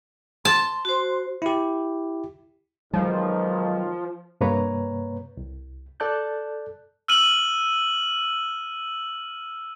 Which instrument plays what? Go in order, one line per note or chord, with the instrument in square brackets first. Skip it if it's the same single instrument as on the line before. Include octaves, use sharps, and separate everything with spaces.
[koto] A5 [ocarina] C6
[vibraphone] F#4 C5
[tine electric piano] E4 G4
[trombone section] B1 D#3 [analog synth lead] F3 [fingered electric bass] F#3 G#3
[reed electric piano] G2 C3 A#3 B4 C#5 A#5
C2
A4 D5 A5 F#6 G6
[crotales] E6 F6 D#7 F#7